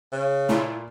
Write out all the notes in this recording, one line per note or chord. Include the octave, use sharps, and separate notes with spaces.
C#3
A#2 A3 E4 F4